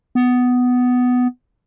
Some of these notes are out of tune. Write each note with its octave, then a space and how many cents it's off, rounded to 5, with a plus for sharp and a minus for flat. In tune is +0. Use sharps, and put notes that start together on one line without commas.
B3 +10